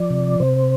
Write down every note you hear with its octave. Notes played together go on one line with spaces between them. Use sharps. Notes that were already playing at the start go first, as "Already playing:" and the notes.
Already playing: F3 D5
C3
C3 C5